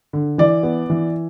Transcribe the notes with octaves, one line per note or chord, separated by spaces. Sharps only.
D3
E3 D5
B3
E3